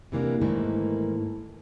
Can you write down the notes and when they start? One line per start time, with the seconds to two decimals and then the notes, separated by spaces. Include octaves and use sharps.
0.12 C3 E3 A#3 D4
0.41 G#2 D#3 E3 A3 A#3